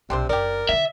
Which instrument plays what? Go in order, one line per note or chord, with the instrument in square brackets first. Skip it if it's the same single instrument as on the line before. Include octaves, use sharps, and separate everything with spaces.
[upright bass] B1 [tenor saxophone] C3 [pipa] C4 D4 C5
[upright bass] F#1 D4 [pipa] G4 D5 [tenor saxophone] A#4
[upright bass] D3 D4 [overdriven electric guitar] E5